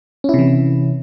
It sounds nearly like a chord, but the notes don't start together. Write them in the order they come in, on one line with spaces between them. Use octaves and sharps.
C#4 E4 C3 E3